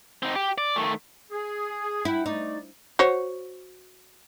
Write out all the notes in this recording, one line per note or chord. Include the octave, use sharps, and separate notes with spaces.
C4 D#4
G4
D5
D#3 A3
G#4
E4 F#5 G5 B5
A3 D#4 D5
F#4 C5 C#5